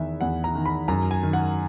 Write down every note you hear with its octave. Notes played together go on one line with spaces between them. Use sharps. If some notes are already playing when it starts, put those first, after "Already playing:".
Already playing: E2 D#3 E5
E2 F#5
A#5
D#3
B5
F#2 A#5
G#5
D#3
F#5